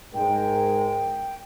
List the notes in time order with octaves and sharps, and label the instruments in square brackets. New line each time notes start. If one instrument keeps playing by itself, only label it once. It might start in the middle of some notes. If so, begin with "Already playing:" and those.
[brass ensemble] G#2 G#3 A#4 [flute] G5